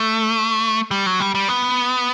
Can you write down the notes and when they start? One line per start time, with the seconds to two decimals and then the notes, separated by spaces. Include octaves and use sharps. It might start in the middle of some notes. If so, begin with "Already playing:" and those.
Already playing: A3
0.91 G3
1.06 F#3
1.20 G3
1.35 G3
1.48 B3